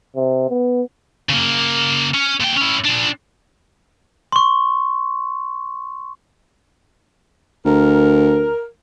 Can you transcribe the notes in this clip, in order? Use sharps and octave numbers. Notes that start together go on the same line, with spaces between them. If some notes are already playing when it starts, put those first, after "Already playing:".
C3
B3
C#3 A#3
C#4
A#2 G5
C#4 E4
A#2 D4
C6 C#6
D2 A#4